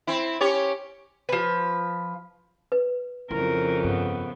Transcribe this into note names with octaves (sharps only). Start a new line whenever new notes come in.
C4 E4
C#4 G4 C#5
F3 B4
B4
F2 C#3 E4 A#4
G2 B3